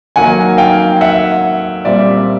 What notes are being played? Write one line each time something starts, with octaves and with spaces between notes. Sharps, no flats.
D#3 F#3 A#3 F#5 G#5
F5 G5
E5 F#5
A#2 G3 C4 D5 E5